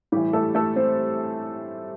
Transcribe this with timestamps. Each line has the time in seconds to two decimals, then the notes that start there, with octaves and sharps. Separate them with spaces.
0.12 A2 E3 G3 G4
0.33 A3 A4
0.55 A3 A4
0.76 C4 C5